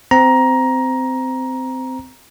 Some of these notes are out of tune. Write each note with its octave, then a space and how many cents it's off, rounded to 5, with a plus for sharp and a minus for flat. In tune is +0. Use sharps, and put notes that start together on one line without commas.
C4 -20 A#5 +15